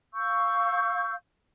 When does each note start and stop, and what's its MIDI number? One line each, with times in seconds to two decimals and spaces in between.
0.14 1.14 77
0.14 1.14 85
0.14 1.14 88
0.14 1.14 91